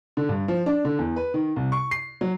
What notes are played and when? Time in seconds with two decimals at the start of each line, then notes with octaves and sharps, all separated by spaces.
0.17 D3
0.29 G2
0.48 F3
0.66 D4
0.85 D3
0.99 E2
1.16 B4
1.34 D#3
1.56 C2
1.72 C#6
1.91 C7
2.21 F#3